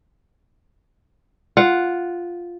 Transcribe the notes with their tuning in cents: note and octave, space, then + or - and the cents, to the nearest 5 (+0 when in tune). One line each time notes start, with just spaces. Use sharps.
F4 +0 F#5 +0